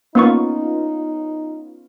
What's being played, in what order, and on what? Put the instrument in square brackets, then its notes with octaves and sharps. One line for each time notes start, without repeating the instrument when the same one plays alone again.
[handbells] A#3 C#6 [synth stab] B3 C#4 F4 [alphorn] D#4